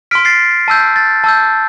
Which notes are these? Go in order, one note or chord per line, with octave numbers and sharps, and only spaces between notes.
C6 F6 B6 D7
A6 C7
A5 E6 G6
A6
A5 E6 G6